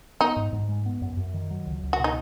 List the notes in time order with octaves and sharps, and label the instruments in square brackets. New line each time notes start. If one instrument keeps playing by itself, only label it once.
[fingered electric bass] B3 [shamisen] D#4
[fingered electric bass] G#2
G#2
G#3
B3
F#2
F#2
D#3
F#3
C#2
C#2
[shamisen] F#4
[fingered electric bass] B2
[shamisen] D#4